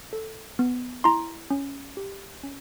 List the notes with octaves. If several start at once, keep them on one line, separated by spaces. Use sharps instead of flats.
A4
B3
E4 A#5 C6
C#4
G4
C#4